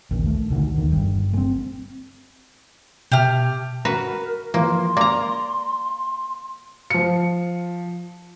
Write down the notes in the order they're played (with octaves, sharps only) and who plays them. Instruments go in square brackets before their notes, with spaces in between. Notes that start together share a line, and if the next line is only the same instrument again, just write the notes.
[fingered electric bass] A#1 D#2
A3
D2 D3 D#3
D#2 D#3
G1 G2
G#3 C4
[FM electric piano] B2 E5 A5 [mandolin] G4 F6
[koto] F#4 B4 [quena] A#4 [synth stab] A#5
[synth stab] E3 F3 [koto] A#3 [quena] C6
[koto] A#3 A#5 [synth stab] D5
[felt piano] F3 C#7